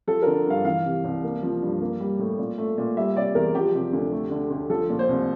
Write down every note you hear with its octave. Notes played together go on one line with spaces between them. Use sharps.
F3 A4
D3 A#4
G2 F5
E3 F5
C3
C2
A#3
F3
G2
A#3
G3
A2
A#2
A3
A#2
G3 E5
C3 D5
E2 A#4
F3 G4
C3
D2
A3
D3
D2
F3 A4
A#2
C5
C2